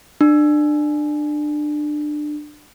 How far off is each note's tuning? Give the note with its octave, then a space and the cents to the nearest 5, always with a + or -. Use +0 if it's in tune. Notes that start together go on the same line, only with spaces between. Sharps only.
D4 +25